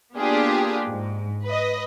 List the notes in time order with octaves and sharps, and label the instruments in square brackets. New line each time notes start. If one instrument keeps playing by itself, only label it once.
[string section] A#3 B3 D4 F4 G4 G#4
G#2
B4 D#5